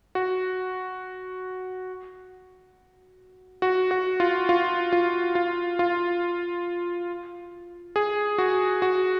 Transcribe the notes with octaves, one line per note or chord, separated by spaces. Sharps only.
F#4
F#4
F#4
F4
F4
F4
F4
F4
G#4
F#4
F#4